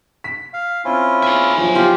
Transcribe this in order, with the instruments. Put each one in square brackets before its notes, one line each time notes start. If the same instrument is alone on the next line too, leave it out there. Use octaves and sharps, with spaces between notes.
[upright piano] B6
[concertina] F5
[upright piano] C4 [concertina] C#4 E4 F4
[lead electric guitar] G#4 E5 [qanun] G#5
[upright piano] F3 F#3 C#5
[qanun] F4 G4